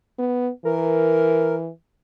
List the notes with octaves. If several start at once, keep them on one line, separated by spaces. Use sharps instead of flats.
B3
E3 A#4